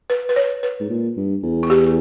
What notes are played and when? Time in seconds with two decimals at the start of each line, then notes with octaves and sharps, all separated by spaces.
0.10 B4
0.29 B4
0.36 C#5
0.63 B4
0.80 G#2
0.90 A#2
1.17 G2
1.43 E2
1.63 E4
1.70 G4